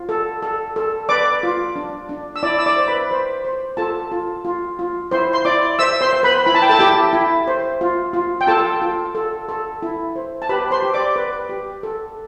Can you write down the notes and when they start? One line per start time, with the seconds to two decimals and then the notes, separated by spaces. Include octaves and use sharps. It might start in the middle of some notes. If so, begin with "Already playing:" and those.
Already playing: F4
0.09 A4
0.42 A4
0.76 A4
1.09 B4 D5 D6
1.43 F4
1.76 D4
2.09 D4
2.36 E6
2.43 E4 D5 D6
2.58 E6
2.66 D5 D6
2.76 C5
2.88 B4 B5
3.11 C5
3.45 C5
3.77 F4 A4 A5
4.12 F4
4.45 F4
4.79 F4
5.11 E4 C5 C6
5.33 C6
5.45 E4 D5 D6
5.79 C5 E5 E6
6.01 C5 C6
6.13 C5
6.23 B4 B5
6.46 E4 B5
6.55 A5
6.62 G5
6.69 A4 A5
6.79 E4 G4 G5
7.13 E4
7.47 C5
7.81 F4
8.13 F4
8.41 G5
8.47 F4 A4 A5
8.82 F4
9.15 A4
9.49 A4
9.82 E4
10.16 C5
10.42 A5
10.49 G4 B4 B5
10.71 C5 C6
10.82 G4
10.94 D5 D6
11.16 B4
11.49 G4
11.83 A4